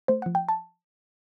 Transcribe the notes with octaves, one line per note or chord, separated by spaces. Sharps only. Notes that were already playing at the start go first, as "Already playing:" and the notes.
A3 C5
F#5
F3
G5
A5